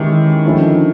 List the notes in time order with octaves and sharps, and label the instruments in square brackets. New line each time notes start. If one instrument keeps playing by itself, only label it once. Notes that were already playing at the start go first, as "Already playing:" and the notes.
Already playing: [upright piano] D#3 [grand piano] E3 G#3 C#4 E4 G4
[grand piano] D3 F3 A3 C#4 E4